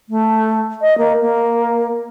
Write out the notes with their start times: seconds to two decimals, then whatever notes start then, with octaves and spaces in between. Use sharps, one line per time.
0.09 A3
0.81 D#5
0.98 A#3
1.21 A#3